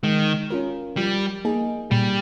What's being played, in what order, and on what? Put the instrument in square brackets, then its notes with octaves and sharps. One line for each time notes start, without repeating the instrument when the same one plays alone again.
[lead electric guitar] D#3 [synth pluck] G#3
[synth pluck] C#4 F4 A#4
[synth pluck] F3 [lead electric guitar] G3
[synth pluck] A#3 D#4 G#4
[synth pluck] A#2 [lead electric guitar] G3